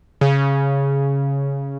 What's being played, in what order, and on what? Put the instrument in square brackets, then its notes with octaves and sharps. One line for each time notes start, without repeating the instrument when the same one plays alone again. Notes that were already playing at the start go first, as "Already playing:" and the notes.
[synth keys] C#3